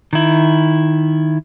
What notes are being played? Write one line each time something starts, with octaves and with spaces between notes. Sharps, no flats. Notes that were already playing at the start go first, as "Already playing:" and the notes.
D#3 E4